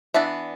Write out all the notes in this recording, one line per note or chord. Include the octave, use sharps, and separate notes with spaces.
E3 B3 D4 E5